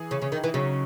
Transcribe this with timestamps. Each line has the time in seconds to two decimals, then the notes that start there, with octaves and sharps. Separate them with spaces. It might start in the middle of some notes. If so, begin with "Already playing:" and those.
Already playing: E3 G#4
0.11 C#3 G#4
0.22 C#3
0.32 D#3 D#4
0.44 E3
0.54 C#3 F#3